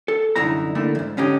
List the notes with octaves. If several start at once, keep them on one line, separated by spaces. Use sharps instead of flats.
A4
C2 F#2 D3 D#4 E4 A#5
D3 A3 A#3 E4
E2 G#2
D3 C#4 D#4 G4